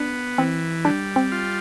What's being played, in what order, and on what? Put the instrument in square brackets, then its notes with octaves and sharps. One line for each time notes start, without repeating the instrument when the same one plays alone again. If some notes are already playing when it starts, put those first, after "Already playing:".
Already playing: [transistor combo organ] B3 [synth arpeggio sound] D4
[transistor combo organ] E3 [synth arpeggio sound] C4
[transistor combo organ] G3 [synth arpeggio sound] D4
[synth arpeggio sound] C4
[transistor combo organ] F4